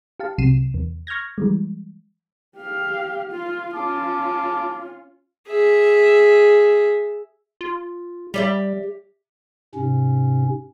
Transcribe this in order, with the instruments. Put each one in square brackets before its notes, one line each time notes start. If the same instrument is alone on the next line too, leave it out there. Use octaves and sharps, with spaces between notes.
[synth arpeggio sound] G4 F5 A5
C2 C3 F#3 C7 D#7 E7
E2
C#6 F6 G6 G#6 A#6
E3 G3 G#3
[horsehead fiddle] G4 F5
F4
[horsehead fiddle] C#4 F4 [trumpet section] A5 D6
[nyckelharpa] G#4 E5
[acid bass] F4
[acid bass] G3 [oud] G4 D5 E5
[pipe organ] G#2 C3 C#4